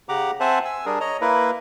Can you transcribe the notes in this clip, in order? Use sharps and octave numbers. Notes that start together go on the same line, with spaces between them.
C#3 G4 F#5 A#5 D6
C4 C5 E5 F#5 G#5 A5
G#5 E6
G3 D4 G#4 A#4
C#5 D#5 A#5
A#3 E4 A#4 B4